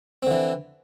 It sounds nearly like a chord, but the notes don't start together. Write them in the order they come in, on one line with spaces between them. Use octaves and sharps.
C4 D3 E3